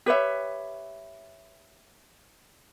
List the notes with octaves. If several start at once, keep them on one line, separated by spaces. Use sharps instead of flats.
G4 B4 C#5 E5